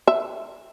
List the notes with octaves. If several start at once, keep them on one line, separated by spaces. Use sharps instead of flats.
E5